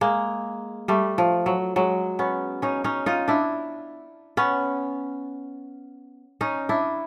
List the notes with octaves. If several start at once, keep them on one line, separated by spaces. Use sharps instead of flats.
G#3 A#3
G3 A3
F3
F#3
F#3 G#3
B3 C#4
C#4 D#4
C#4 D#4
D#4 F4
D4 E4
B3 C#4
C#4 D#4
D4 E4